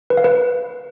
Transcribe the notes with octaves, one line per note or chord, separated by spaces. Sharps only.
B4
F5
B4